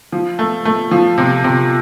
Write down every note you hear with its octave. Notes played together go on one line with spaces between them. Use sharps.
F3
A3
A3
F3
C3
C3